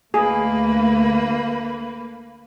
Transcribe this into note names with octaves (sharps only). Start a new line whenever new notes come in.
D2 A3 A#3 G#4 B4